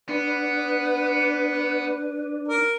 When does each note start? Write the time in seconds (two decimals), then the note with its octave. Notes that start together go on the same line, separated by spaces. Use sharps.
0.09 B3 D4 B4
2.48 A#4